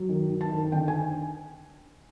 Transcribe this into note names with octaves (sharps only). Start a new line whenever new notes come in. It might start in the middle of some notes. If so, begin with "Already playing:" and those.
Already playing: F#3
D#3
D#3
A5
D#3
D3 G5
G#5